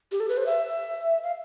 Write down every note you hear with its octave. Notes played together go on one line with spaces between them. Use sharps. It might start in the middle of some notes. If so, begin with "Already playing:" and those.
G4
A4
B4
C5
E5
F5